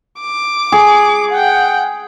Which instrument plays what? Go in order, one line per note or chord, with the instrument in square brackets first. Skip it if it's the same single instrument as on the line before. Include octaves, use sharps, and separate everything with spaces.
[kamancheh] D6
[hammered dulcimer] G#4
[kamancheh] F#5 G5